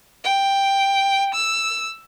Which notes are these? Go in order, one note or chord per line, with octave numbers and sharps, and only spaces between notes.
G5
E6